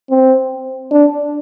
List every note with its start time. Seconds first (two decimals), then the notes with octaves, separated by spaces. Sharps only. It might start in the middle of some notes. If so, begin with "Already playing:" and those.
0.10 C4
0.92 D4